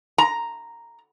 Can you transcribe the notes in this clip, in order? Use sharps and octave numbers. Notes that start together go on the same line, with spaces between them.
A#5